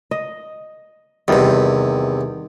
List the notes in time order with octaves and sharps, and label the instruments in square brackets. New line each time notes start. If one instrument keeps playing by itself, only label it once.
[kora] D#5
[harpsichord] E2 C3 [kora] D#3 G3